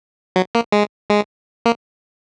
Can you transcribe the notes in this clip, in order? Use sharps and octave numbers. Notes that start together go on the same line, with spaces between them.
F#3
A#3
G#3
G#3
A#3